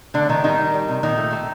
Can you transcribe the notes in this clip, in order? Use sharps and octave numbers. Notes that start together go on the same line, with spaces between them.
D3 A3 D4
A2 D#3 D#4
D#3 G3 D#4
G3
G3
C3
A#2 D#3 D#4
A3
A3